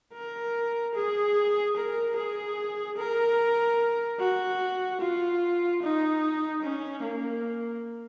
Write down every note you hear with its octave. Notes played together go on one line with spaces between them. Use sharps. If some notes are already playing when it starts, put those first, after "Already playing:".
A#4
G#4
A#4
G#4
A#4
F#4
F4
D#4
C#4
A#3